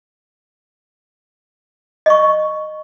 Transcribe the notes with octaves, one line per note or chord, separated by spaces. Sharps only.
D#5 C#6